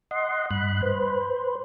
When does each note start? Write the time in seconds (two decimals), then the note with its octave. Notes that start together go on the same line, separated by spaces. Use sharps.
0.11 D#5 F#5 C6
0.51 G2 B5 F#6
0.82 B4 C5